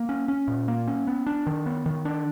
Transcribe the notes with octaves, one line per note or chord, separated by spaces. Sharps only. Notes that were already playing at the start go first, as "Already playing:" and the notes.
Already playing: A#3
C#4
C#4
A#2
A#3
C#4
B3
D4
D#3
B3
D#3
D4